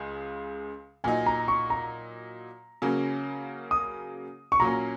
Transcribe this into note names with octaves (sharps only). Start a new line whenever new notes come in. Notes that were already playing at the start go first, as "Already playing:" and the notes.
Already playing: C#2 C#3 G#3
A#2 F#3 D#4 G#5
A#5
C#6
A#5
C#3 F#3 A#3 C#4
D#6
C#6
A#2 F#3 A#3 C#4 A#5